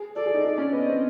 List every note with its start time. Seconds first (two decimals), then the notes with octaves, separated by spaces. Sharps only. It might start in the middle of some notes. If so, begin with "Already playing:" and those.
Already playing: G#4
0.15 A4 D5
0.26 G#4
0.34 D#4
0.45 D4
0.58 C#4
0.72 B3 D#5
0.86 C4